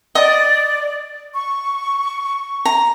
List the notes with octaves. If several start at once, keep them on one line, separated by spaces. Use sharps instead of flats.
D5 D#5 D#6
C#6
A#5